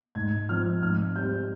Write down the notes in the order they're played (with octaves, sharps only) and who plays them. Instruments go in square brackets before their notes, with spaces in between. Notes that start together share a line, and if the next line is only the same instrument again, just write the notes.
[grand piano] G#2 G#6
F3 C4 F6
G#2 F6
G3 C4 G6